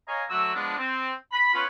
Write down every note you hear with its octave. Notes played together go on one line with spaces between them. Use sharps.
C#5 D#5 F5 G#5 A#5
D3 F#3 A3 F#4 E6
F3 G#3 B3 D4
C4
B5
B3 C#4 F4 B4 C#5 B5